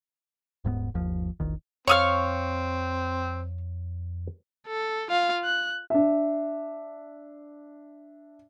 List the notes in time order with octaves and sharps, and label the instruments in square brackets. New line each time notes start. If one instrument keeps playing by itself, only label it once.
[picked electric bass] D#1 G#2 G#3 B3
G1 D#2 F3
E1 A#1 D#3
[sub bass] F2 [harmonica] C4 [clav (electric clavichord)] C#5 F5 [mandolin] C#6 D#6 F6
[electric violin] A4
F4 F5
F#6
[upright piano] D4 E5